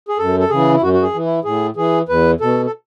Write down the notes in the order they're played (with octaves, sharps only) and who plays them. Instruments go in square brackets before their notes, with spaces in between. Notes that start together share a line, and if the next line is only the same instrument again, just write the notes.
[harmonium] G#4
F#2 A4
A4
C#3 E3 G#4
E4
F#2 F#4
F#4
G#4
E3
E4
A2 G#4
E3 G#4
E2 B4
B2 A4
A4